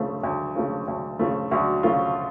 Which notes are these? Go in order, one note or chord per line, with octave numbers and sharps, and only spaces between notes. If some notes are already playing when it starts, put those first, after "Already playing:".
Already playing: D2 C#3 F3 A3
D2
C#3 F3 A3
D2
C#3 F3 A3
D2 F#4
C#3 F3 A3 F4